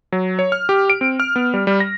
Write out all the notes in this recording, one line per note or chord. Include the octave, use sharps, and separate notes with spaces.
F#3
C#5
F6
G4
D7
C4
F6
B3
G3
G3
A#6